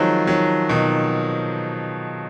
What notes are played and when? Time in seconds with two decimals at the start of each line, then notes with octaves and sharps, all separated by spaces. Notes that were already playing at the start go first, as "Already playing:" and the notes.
Already playing: D#3 F3 F#3 G#3
0.27 D#3 F#3
0.69 B2 D#3